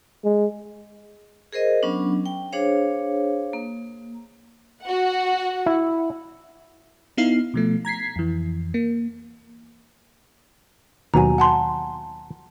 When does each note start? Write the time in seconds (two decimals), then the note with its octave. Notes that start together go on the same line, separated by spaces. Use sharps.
0.24 G#3
1.53 G#4 A#4 C5 D#5
1.83 F#3 B3 C#4 D4
2.26 G5
2.53 D4 G#4 C5 C#5 F5
3.53 A#3
4.82 F#4 F#5
5.66 E4
7.17 B3 D#4 E4 F5 C7
7.54 B2 F3 A3
7.85 A#5 G#6 B6 C7
8.16 F2 E3
8.74 A#3
11.14 D#2 B2 F#3 G#5 A#5
11.38 F#5 A5 C6